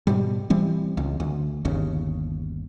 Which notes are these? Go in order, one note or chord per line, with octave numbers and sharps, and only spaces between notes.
G#2 B2 G3
E3 G3 C4
C#2
D2
G1 D#2 C#3